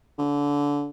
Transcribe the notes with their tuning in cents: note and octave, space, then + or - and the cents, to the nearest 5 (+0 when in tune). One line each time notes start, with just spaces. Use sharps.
D3 -25